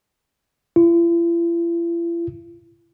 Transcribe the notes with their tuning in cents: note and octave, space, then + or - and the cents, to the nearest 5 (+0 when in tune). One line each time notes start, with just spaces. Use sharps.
E4 +45